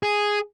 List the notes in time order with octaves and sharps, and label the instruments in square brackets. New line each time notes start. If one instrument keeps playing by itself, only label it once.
[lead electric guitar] G#4